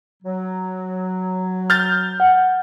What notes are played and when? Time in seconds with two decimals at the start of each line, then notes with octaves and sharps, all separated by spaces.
0.23 F#3
1.70 F6 G6 A6
2.20 F#5